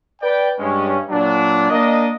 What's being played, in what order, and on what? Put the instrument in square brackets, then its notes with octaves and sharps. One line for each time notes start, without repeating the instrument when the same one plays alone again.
[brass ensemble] B4 D5 G5
G2 G#3 C#4
A#2 F#3 D4
A#3 D4 D#5